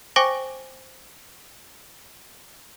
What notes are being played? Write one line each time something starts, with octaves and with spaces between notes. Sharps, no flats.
C5 G5 G#5 C#6 D6 A#6